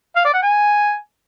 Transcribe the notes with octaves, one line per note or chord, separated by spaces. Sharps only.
F5
D5
F#5
G#5